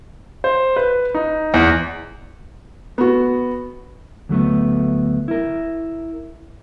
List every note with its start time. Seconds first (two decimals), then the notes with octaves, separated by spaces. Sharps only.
0.44 C5
0.76 B4
1.14 D#4
1.54 E2
2.98 B3 F#4
4.29 D2 F#3 A3 B3
5.28 E4 A#4